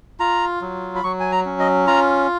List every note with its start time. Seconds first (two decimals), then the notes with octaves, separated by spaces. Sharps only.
0.20 F4 A#5
0.62 F#3
0.96 B5
1.04 F#3 C#6
1.20 G#5
1.32 A#5
1.45 C#4
1.59 D#5
1.87 F4 A#5